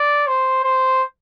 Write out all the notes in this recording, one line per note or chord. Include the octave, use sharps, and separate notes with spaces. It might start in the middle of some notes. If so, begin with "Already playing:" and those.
Already playing: D5
C5
C5